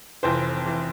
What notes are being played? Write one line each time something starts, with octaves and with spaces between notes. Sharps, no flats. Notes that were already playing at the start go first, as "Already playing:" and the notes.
F1 F2 E3 C5
E3